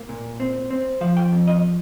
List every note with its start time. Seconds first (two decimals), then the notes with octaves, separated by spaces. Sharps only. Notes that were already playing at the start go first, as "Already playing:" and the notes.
Already playing: A#3
0.09 A#2
0.40 C4
0.70 C4
1.01 F3 F5
1.17 G5
1.32 F2
1.47 D#5